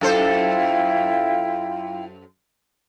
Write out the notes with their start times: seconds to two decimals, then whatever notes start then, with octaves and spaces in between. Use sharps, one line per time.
0.01 F#2 E4 F4 A4 C5 G5